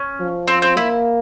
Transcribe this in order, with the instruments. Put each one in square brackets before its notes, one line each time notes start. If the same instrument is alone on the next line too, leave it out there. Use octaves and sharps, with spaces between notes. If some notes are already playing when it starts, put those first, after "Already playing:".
Already playing: [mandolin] C#4
[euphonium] F3
[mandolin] C4
C4
[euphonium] A#3 [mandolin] E4